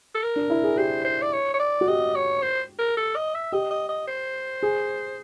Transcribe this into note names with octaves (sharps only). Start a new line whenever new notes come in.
A4
A#4
D4
E4
G#4
G4 C5
C5
D5
C#5
C#5
D5
F#4
G4 D#5
C#5
C5
A#4
A4
D#5
E5
G4 D#5
D#5
D#5
C5
G#4